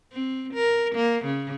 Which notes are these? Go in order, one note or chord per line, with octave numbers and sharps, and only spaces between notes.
C4
A#4
A#3
C#3